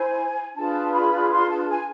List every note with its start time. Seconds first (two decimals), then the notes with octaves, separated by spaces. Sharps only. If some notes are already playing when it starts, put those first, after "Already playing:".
Already playing: E4 C5 G#5
0.55 D4 F4 G#4 B4 A5
0.93 B5
1.30 C6
1.48 A5
1.68 G#5